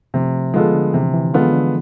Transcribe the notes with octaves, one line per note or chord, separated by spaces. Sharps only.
C3 F3 A3
D3 F3 G#3 B3 F4 A4
D3
C3 E3
E3
D3 G#3 B3 F4 A4
D3